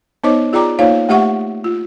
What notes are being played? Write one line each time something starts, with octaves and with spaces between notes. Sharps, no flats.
B3 D#4 C5 C#5 D#5 D6
F4 G#4 D5 G5 A#5 D6
A#3 D#4 F4 C5 C#5 F5
A3 G4 E5 F#5 C#6
F4